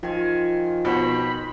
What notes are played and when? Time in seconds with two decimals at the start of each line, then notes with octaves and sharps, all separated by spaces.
0.03 D#3 F3 F4 G#5
0.85 B2 D#3 C5 B5